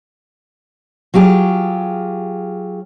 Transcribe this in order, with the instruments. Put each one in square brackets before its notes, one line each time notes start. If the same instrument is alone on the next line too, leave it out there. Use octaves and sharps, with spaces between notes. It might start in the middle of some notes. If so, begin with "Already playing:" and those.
[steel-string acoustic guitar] F#3 F4 G4 G#4